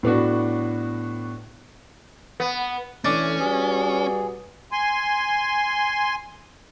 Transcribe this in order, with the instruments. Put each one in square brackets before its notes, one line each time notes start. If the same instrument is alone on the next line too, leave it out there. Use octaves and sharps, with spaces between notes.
[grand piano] A2 B3 D4 F#4
[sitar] B3
[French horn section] E3 A3 [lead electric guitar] C#4 [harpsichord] D4
[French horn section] G3 F#4 B4 [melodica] G#4
[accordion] G#5 C6